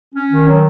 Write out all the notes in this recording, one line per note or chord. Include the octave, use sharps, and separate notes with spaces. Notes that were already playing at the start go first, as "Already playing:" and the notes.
C#4
D#3
F#3